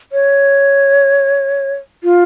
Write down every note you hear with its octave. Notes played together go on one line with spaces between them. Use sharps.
C#5
F4